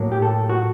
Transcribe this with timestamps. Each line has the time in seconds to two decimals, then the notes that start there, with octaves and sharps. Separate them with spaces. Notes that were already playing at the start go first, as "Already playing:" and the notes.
Already playing: A2 F#3 A#3
0.12 G4
0.22 A4
0.49 F#4